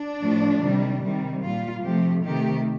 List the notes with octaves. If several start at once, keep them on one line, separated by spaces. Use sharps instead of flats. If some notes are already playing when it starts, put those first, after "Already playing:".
Already playing: D4
A2 F3 A3
C3 D#3 G3
C3 D#3 G3
A#2 G3 F4
C3 F3 A3 G4
C3 D#3 A3 G4